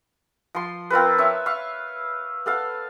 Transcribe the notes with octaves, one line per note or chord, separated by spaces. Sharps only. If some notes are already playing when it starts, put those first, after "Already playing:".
F3 C6
C4 F4 A#4 B4
C#5 E5 A5
E5 F5 C#6
B3 A4 F5